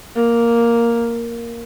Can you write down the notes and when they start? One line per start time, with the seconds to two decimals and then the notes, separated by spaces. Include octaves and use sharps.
0.16 A#3